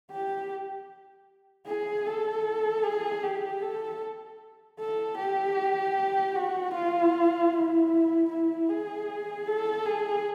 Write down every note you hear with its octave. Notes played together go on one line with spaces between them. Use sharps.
G4
G#4
A4
G#4
G4
A4
A4
G4
F#4
F4
E4
E4
G#4
A4
G#4